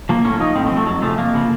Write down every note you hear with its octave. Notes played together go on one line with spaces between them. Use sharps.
F3 A#3
A2 C#4
F3 D#4
A2 C4
F3 C4
A3
F2 F#3
C#3 F3 A3
F2 A#3
C#3 F3